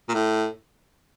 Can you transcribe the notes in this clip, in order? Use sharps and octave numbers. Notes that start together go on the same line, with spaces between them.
A#2
A2